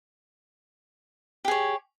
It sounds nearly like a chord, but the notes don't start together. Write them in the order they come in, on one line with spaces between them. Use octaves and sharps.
G4 G#4 C#5